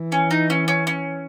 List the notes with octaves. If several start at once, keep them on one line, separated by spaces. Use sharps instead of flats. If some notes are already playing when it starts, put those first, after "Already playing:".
Already playing: E3
C#4
D#4
C#4
C#4
C#4